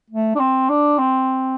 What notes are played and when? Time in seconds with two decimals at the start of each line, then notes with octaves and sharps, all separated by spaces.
0.10 A3
0.35 D4
0.40 C4
0.69 D4
0.98 C4